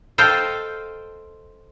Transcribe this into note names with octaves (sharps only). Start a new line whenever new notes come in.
A4 C5 D#5 F5 G5